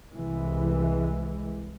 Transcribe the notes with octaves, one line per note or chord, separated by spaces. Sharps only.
C2 E3 G#3